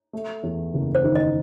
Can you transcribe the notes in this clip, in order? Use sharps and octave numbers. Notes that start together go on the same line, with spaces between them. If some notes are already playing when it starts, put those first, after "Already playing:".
A3
E2
F#1
C5
D#3
D#5